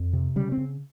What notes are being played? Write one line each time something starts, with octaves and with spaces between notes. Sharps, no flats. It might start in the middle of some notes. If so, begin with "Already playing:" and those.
Already playing: F2
C3
C#3 G3
C4
C#3